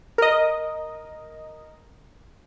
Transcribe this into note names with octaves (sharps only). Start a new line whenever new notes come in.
A#4 D#5